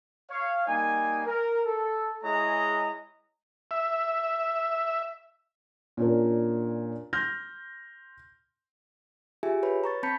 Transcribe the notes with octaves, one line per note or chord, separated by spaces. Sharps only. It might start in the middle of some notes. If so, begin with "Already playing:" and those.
C#5 F5
G3 A#3 D#4 G#5
A#4
A4
G#3 E4 G#4 C#5 D#5 A#5
E5
A#2 C#4 D4 A#4
C6 F6 G6 A#6
F4 G4 G#4 E5 G#5
B4 C#5 B5
A#5 C#6 A6
C4 A5 B5 G6 B6 C#7